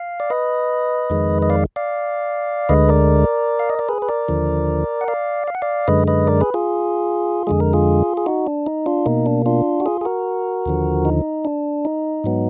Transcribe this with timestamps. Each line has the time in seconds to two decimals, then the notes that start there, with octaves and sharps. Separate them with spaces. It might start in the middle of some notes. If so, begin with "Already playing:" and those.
Already playing: F5
0.20 D5
0.30 B4 D#5
1.10 F2 D#3 G#3
1.42 D#5
1.50 D5 F5
1.76 D5 F5
2.69 D2 D3 G#3 B4 D#5
2.89 A#4 D5
3.59 F5
3.70 D#5
3.79 D5
3.89 G#4 B4
4.02 B4
4.09 A#4 D5
4.28 D#2 D3 F3
5.01 F#5
5.08 D5 F5
5.48 F5
5.55 F#5
5.62 D5 F5
5.88 F#2 D3 G#3 B4 D#5
6.08 B4 D#5
6.27 A#4 D5
6.41 G#4 B4
6.54 F4 G#4
7.47 F2 D3 G#3 G#4
7.60 A#4
7.73 F4 G#4
8.17 G#4
8.26 D#4 F#4
8.47 D4
8.66 D#4
8.86 D4 F4
9.06 B2 A#3 D#4
9.26 D4
9.46 D4 F4
9.80 F#4
9.86 F4 G#4
10.01 G#4
10.05 F#4 A#4
10.66 D#2 D3 F3
11.05 D#4
11.45 D4
11.85 D#4
12.24 G#2 F#3 B3